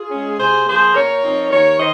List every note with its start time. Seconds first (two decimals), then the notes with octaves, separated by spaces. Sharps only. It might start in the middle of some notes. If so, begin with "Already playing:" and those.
Already playing: F4 G#4
0.11 G#3 C#4
0.38 C3 G#4 C5
0.66 F3 A#3 G#4 C5
0.94 A#2 A#4 C#5
1.22 F3 C4 D#4
1.50 D#2 A#4 C#5
1.78 D#3 C5 D#5